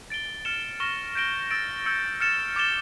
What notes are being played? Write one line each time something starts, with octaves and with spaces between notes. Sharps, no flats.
A6 D7 G7
F6 A6 C#7 E7 G7
C#6 F6 A#6 E7 G7
G6 A#6 D7 G7
E6 A6 D7
E6 G6 C#7
F6 A6 C#7 E7
D6 A6 E7 G7